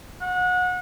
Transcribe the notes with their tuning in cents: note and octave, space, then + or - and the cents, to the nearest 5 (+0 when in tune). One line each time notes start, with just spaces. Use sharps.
F#5 -30